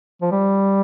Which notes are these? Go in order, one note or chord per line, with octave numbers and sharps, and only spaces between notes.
F3
G3